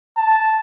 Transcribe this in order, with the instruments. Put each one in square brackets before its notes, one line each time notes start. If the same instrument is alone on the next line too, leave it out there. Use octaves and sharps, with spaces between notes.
[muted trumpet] A5